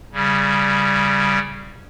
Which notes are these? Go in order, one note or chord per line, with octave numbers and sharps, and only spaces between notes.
C#3 G3